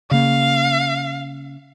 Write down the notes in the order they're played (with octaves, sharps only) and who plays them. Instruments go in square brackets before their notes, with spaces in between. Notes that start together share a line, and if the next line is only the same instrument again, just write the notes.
[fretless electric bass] C#3 A#3 [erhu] F5